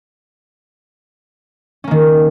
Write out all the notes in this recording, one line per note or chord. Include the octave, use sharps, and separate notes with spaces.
D#3 A#3 C#4